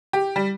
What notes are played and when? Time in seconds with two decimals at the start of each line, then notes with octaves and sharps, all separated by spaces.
0.13 G4
0.36 G3